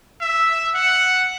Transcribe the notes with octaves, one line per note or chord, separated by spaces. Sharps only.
E5
F#5